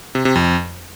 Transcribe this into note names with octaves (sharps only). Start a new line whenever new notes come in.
C3
C3
F2